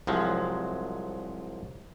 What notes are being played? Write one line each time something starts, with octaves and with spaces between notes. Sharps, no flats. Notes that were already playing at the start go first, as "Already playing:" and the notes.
C2 F3 F#3 G#3